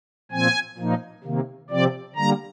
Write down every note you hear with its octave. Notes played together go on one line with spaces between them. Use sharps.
A#2 F3 C4 G#5
A#2 F3 A#3 D#4
C3 D#3 A#3
C3 F3 C4 D5
D3 G3 A#3 A#5